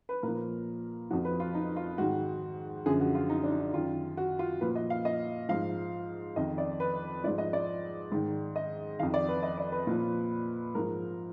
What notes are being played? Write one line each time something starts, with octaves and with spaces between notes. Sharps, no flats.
B4
A#2 F3 A#4
F2 F3 F#4
B4
F4
D#4
F4
G#2 D#3 F#4
F#2 D3 F3 G#4
F#4
F4
D#4
D4
D#4
F#2 D#3 F4
F#4
F4
A#2 F3 B4
D#5
F5
D#5
G#2 F3 F5
F2 D#3 D#5
D5
B4
G#2 F3 D5
D#5
D5
G#2 D#3
D#5
F2 D#3 F5
D5
B4
D#5
D5
B4
A#2 F3
G#2 F3 A#4